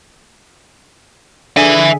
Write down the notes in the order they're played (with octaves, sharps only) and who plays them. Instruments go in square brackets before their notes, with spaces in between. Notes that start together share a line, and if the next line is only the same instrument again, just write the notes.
[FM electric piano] D3 G#4 [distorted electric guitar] E5 G#5